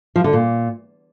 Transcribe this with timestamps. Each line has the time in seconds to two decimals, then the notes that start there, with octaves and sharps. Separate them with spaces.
0.16 F3
0.24 D3
0.33 A#2